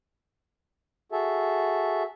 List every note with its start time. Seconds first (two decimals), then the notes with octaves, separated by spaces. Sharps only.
1.12 F#4 G#4 A4 E5